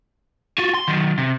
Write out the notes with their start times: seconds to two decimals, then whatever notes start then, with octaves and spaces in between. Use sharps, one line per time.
0.58 F4 F#4
0.74 C6
0.88 D#3 F#3
1.18 C3